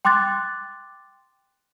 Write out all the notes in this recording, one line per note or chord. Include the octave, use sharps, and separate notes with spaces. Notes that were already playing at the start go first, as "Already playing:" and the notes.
G5 C6 D6 F#6 A6